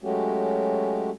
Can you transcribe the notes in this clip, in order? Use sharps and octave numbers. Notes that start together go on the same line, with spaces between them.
F#3 G#3 A3 C#4 F#4 G4